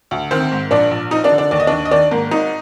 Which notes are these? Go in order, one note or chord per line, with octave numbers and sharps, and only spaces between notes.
D2
D#3 C4 C5
G#2
A#1 D4 D5
A#1
F3 D#4 D#5
D4 D5
D3
D4 D5
D#2 D5
D#5
D#2 D4 D5
D#5
D#3 D4 D5
G#2 A#3 A#4
G#1 D#4